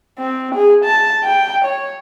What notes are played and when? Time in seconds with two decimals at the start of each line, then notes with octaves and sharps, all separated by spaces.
0.19 C4
0.55 G#4
0.84 A5
1.24 G5
1.65 C#5